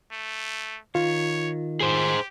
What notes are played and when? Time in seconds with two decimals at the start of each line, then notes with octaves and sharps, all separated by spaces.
0.12 A3
0.95 D#3 F4 C#5
1.81 G4 G#4 C5